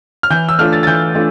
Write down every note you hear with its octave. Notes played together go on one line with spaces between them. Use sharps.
F6
E3 G6
E6
A3 D4 F4 F6
A6
A6
E3 G6
A3 D4 F4